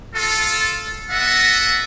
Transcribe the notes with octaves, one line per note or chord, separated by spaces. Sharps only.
F4 A4
B3 A4 D#5 E5 F#5